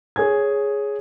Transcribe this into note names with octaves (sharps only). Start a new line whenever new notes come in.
G#4 C#5 G#5 G#6